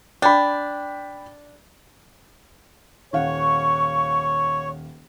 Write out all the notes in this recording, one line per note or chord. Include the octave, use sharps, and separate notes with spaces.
D4 G5 B5
D#1 C#5 F5 F#5 C#6